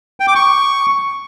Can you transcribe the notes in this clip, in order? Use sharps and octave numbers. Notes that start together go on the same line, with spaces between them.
G5
D6
C#6